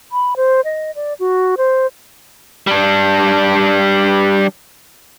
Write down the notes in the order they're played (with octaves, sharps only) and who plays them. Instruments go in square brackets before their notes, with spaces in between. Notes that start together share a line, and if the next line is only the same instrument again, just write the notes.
[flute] B5
C5
D#5
D5
F#4
C5
[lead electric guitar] G3 D4